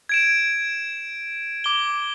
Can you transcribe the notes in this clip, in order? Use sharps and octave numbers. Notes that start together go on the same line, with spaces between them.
G#6 D7 E7
D6 G7